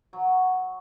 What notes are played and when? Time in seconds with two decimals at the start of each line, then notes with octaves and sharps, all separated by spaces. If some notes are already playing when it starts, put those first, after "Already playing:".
0.13 F#3